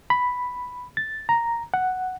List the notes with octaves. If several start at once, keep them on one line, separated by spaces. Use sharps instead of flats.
B5
A6
A#5
F#5